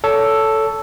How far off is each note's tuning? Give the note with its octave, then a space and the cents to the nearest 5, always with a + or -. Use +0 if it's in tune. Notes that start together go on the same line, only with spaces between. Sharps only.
A4 +0 C#5 +30